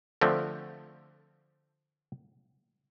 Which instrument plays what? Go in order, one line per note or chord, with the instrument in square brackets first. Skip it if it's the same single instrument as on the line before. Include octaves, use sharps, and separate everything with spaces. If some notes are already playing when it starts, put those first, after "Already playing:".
[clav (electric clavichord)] D3 F3 A3 C4